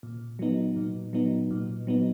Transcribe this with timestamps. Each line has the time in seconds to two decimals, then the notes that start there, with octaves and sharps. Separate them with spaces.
0.03 A#2
0.39 F#3 B3 D#4
0.76 A#2
1.13 F#3 B3 D#4
1.51 A#2
1.87 F#3 B3 D#4